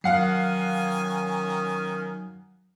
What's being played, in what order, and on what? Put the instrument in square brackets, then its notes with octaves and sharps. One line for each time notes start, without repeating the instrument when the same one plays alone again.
[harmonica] D#3 C#4 G#5 [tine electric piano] F#3 [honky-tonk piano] F5 F#5 C7